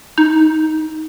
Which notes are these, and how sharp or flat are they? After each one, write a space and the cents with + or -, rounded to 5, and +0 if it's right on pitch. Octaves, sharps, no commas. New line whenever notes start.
D#4 +10